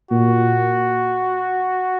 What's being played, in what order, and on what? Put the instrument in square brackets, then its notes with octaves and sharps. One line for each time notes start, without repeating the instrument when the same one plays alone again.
[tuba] A#2 [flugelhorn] F#4